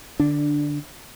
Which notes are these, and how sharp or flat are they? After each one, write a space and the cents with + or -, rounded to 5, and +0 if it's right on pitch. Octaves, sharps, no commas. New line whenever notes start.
D3 +15 D4 +0